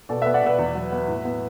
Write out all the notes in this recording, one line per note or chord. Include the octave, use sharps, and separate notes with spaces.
B2 A4 D5
B3 B4 E5
D5 F#5
B2 B4 E5
E2
F#3
B3
A2
B3